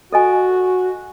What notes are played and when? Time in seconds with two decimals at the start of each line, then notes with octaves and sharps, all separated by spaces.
0.13 F#4 A4 D#5 G#5